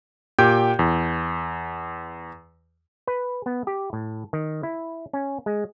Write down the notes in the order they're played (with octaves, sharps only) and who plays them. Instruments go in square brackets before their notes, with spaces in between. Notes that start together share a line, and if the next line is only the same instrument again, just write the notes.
[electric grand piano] A#2 G4 G5 G6
E2
[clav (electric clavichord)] B4
B3
G4
A2
D#3
E4
C#4
G#3